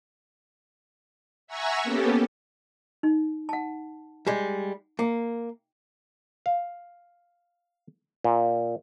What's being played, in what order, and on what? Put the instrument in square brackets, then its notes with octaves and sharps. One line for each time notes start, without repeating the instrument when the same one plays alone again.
[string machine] E5 F#5 G#5 A#5 C#6 E6
A#3 B3 C#4 G4 A4
[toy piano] D#4
F#5 A5
[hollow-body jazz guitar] G3 G#3
[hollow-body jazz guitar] A#3 [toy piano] G5
[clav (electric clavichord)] F5
A#2